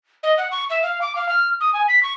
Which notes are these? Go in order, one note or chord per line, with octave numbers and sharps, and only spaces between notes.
D#5
F#5
C#6
E5
F5
D6
F5
F6
D#6
G#5
B6
C#6